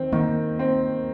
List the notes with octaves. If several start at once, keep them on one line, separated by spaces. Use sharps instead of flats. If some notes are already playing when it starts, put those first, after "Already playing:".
Already playing: D#3 C4
D#3 A#3
C4